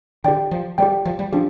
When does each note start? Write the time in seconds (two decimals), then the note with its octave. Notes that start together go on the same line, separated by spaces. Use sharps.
0.24 D3 G4 D5 G5
0.51 F3
0.78 G3 G4 D5 G5
1.05 F3
1.19 G3
1.33 F3 D4 G4